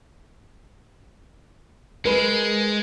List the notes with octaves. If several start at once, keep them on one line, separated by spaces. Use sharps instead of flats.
G#3 A#4 B4